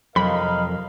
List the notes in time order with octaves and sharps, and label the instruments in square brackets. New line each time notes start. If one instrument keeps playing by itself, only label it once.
[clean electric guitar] F2 [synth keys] C3 F#3 [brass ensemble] A#4 D#5 F5 [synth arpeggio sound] B5